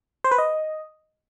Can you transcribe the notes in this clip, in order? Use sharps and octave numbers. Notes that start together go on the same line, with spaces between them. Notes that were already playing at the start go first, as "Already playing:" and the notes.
C5
B4
D#5